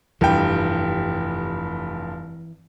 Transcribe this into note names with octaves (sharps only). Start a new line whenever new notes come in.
F1 G2 E3 G5